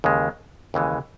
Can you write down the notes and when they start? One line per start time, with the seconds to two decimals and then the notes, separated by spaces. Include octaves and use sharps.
0.04 D#2 C#3 E3 G#3
0.74 D#2 C#3 E3 G#3